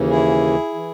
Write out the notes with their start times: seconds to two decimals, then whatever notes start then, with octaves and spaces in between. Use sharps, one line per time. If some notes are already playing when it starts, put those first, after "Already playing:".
Already playing: D#2 C#3 E3
0.10 E4 G#4
0.74 E3